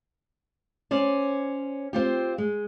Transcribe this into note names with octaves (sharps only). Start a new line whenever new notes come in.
C#4 C5 D5
C4 F4 G4
G#3